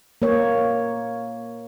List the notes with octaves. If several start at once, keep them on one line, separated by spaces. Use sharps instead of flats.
A#3 C#5